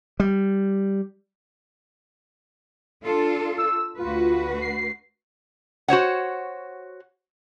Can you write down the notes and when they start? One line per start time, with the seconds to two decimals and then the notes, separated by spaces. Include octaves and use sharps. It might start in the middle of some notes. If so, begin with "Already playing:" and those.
0.20 G3
3.04 D4 F4 A4
3.58 E6
3.99 D2 F4 F#4 B4
4.61 C7
5.88 F#4 C5 C#5 F#5